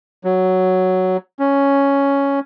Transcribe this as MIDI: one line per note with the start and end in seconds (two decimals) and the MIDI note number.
0.24 1.17 54
1.39 2.40 61